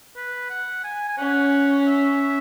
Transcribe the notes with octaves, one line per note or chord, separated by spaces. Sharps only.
B4
F#5
G#5
G#5
C#4 F#5
E5